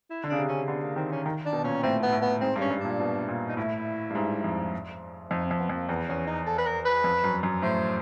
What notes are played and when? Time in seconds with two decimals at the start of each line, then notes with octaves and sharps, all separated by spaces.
0.10 E4
0.24 D3
0.29 C#3 D4
0.38 C3
0.48 C#4
0.68 D3 B3
0.82 A#3
0.96 D#3 C4
1.12 C#4
1.26 D#3
1.46 D4
1.53 B2
1.64 A#2 C#4
1.83 A2 C4
2.03 B3
2.12 A2
2.22 B3
2.41 G#2 C4
2.56 G2
2.61 C#4
2.70 G2
2.80 A#2 D4
3.00 B2
3.28 A#2
3.49 D#4
3.57 A2 E4
4.10 G2
4.15 G#2
4.44 F2
5.31 F2 D#4
5.45 C4
5.51 F2
5.60 B3
5.69 F2
5.74 A#3
5.89 E2 B3
6.09 E2 C#4
6.27 D#4
6.46 A4
6.58 B4
6.66 A#4
6.85 B4
7.04 F2
7.24 F#2
7.43 F#2
7.62 A2 C5